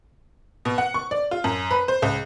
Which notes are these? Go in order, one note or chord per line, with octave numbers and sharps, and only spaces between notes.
B2
F#5
C#6
D5
F4
F#2
B4
C5
C#2